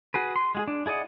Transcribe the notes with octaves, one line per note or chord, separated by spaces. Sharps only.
F#4 G#4 B4
C6
G#3 F#4 G#4
D4
E4 G#4 D5 D#5 F#5